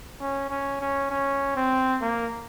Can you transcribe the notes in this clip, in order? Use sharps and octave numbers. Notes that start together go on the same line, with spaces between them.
C#4
C#4
C#4
C#4
C4
A#3